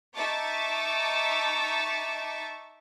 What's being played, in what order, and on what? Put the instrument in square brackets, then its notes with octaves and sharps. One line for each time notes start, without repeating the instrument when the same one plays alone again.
[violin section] D#4 E5 A5 C#6 D6